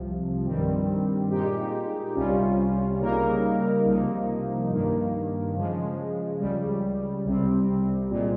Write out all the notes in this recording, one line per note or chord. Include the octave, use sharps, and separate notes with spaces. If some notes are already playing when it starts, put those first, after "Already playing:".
Already playing: C2 C3 F3
G2 D#3 G3 C4
A#2 G#3 D#4 G4
C2 C3 G3 C#4 F4
C#3 G3 A#3 D#4 A#4
C2 C3 F3 A#3 D#4
G2 D#3 A#3
C#3 F3 G#3
C#2 C#3 G3
C2 C3 G3 C4
C2 A#2 G#3